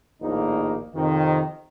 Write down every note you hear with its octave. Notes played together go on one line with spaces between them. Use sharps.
A#1 D#2 A2 A#3 D#4
F2 C3 D#3